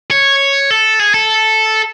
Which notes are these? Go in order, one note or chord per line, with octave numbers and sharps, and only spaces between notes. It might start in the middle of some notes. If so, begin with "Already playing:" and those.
C#5
A4
G#4
A4